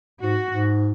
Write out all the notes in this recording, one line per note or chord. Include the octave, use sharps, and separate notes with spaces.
G#2 F#4
G#2